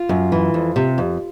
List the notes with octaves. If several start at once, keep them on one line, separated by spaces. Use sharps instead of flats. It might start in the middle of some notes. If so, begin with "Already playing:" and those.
Already playing: F4
F#2
E3
F2
C3
F2